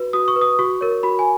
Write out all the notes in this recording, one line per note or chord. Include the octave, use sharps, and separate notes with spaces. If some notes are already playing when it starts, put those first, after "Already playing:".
Already playing: F#4 B4
F#4 D#6
C#6
B4
D#6
F#4 C#6
A#4 C#5
F#4 B5
G#5